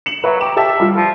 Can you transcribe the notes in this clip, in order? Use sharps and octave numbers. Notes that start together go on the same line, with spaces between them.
C#7 E7 F#7
F#3 B4 E5
G4 A#5 E7
G4 D#5 E5 A5
G3 F4
F3